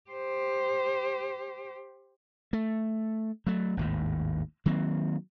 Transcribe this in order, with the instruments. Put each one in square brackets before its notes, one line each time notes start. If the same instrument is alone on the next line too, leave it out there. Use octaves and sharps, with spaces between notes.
[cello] G4 C5
[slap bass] A3
F#3 A3
G#1 D#2 A2
D#3 F#3 A#3 C4